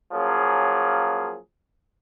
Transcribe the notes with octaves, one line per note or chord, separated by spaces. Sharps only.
F3 F#3 A#3 C#4 G#4